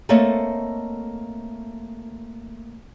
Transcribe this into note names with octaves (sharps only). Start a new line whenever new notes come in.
A3 A#3 C4 A4 C#5 D#5